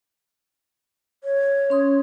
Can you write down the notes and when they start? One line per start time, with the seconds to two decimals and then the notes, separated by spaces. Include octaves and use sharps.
1.24 C#5
1.70 C#4 C6 D#6